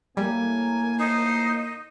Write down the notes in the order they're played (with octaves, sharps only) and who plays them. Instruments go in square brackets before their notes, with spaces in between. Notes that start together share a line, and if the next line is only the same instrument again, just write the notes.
[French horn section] A2 A#3 [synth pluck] G3 [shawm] G#5
[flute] D#4 [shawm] C5